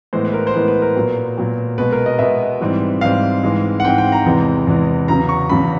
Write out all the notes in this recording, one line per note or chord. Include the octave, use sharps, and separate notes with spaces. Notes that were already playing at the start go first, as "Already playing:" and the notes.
A2 E3 G#3 B3 C5
B4
A#4
C5
A2 E3 G#3 B3 B4
B4
A#4
A#2 F#3 B3
A#2 F#3 B3
B2 G#3 B3 B4
A#4
D#5
B2 G#3 B3 E5
G#2 E3 G3 C4
G#2 E3 G3 C4 F5
G#2 E3 G#3 C4
F#5
G#2 E3 G#3 C4 G5
G5
A#5
E2 C3 E3 G#3
E2 C3 E3 G#3
E2 C#3 F#3 B3 A#5
C#6
E2 C#3 F#3 B3 B5